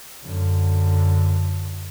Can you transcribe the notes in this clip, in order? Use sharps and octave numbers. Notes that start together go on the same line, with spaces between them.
F#2 D3